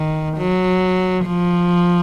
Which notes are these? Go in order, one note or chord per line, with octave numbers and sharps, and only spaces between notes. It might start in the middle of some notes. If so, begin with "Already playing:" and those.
Already playing: D#3
F#3
F3